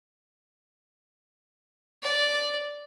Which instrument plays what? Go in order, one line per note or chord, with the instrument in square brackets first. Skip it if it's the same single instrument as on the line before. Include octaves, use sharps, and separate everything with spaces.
[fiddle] D5